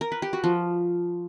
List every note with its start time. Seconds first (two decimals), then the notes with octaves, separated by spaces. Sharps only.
0.01 A#4
0.12 B4
0.22 G4
0.33 F#4
0.44 F3